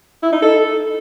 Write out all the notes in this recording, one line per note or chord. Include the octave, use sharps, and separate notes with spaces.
E4
D#4
A4